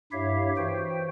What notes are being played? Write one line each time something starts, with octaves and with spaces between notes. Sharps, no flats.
G2 E4 G4 C#5 E5 F5
E3 F#4 C5 G5